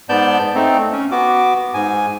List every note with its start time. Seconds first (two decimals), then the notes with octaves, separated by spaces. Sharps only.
0.09 G#2 B3 D5 A5 G6
0.55 A3 C4 D#4
0.92 C#4
1.11 B3 F#4 D6
1.74 G#2 G#5